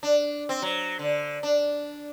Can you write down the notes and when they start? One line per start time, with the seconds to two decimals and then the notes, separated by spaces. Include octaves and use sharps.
0.03 D4
0.49 C4
0.62 F#3
0.99 D3
1.43 D4